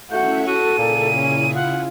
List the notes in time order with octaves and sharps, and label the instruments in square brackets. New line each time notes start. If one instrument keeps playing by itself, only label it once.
[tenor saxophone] A3 [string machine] C#4 E4 E5 [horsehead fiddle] F#4 F#5 [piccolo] G6
[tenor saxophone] F#4 [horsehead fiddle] A4 [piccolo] D#7
[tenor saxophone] A#2 [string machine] C#3 E4 G#4
[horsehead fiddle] C#4
[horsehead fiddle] F4 [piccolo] F#5